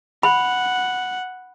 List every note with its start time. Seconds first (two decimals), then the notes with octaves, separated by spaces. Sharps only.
0.23 F#5 B5